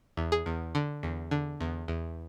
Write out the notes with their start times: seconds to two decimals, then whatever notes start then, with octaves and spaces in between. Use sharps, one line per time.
0.17 E2
0.32 G#4
0.46 E2
0.75 D3
1.03 E2
1.31 D3
1.61 E2
1.88 E2